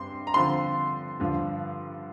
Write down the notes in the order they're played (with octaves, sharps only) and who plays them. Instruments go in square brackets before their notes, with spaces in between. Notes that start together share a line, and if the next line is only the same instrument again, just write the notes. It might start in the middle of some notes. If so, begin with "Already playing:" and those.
Already playing: [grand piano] G2 G3 C4 C6
A#5
D3 F3 C4 C6
G2 D3 F3